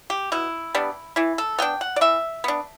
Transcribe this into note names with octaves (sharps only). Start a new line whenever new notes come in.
G4
B2 E4
G3 B3 D4
E3 E4
A4
B3 D4 G5
F#5
D5
E3 E5
B3 D4